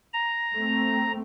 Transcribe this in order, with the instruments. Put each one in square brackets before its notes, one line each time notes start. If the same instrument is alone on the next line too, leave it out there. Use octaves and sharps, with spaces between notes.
[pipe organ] A#5
[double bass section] A3 C4